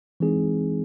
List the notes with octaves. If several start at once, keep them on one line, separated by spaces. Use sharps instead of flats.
E3 G#3 C4 D#4 G#4